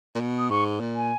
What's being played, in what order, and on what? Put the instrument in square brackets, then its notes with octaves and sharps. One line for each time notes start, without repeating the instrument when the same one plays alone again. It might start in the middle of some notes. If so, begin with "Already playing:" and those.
[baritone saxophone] A#2
B2
[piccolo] D#6
[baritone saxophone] G#2 [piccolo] C#6
[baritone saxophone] A#2
[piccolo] G#5